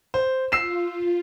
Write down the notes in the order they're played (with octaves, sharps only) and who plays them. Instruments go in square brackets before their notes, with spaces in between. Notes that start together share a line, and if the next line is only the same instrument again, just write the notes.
[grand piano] C5
[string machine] F4 [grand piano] E6 C7 E7